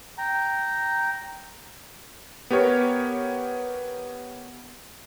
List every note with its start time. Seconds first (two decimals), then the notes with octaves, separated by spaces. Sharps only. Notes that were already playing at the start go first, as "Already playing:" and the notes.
0.18 G5 A#5
2.50 B3 G4 A#4 C#5